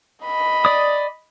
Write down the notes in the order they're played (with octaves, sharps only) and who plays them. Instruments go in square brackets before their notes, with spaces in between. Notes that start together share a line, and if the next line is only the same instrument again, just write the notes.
[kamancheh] D#5 B5
[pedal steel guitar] D5 D#6